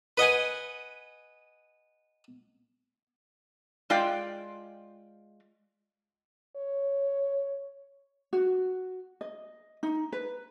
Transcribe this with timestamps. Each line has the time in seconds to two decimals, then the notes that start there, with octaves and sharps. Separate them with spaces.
0.17 B4 D#5 F#5 G#5
3.90 G#3 F4 D5 G5
6.56 C#5
8.33 F#4
9.21 D#5
9.83 D#4
10.12 B4